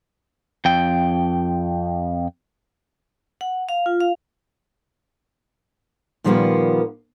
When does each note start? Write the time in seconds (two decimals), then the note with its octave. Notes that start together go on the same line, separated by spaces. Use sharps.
0.65 F2 G5
3.41 F#5
3.69 F5
3.86 F4
4.01 F5
6.24 A#2 D#3 F3 G3 A#3 B3